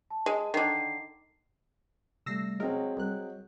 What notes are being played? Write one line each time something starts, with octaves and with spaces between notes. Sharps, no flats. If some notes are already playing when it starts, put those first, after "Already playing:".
A5
G#3
D3 D#3 C7
C3 G3 A3 E6 A#6 C7
F#3 G#3 C4 A#4 D#5
C2 F#3 F#6